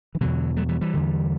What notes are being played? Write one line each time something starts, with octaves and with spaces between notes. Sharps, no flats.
E3
E2 B2 D3 F#3
F#3 A3
E3 G3
E3 G3
E2 D3